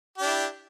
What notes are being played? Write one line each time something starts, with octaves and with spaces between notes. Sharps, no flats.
D4 E4 G4